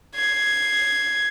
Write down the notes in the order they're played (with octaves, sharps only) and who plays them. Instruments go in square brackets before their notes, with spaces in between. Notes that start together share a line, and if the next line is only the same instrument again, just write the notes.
[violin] G#6 C7